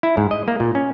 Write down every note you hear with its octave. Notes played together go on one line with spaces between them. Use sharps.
E4
G#2
D#5
A#3
A#2
C#4